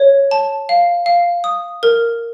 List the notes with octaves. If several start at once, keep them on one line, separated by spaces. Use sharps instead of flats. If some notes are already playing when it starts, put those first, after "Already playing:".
Already playing: C#5
A5
F5
F5
D#6
A#4